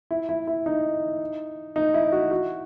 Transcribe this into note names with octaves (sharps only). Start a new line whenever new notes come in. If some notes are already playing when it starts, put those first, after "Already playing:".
E4
E4
E4
D#4
D#4
E4
F#4
F#4